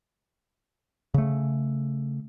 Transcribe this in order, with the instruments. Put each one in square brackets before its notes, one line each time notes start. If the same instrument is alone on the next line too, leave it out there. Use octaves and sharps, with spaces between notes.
[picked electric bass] C#3 A3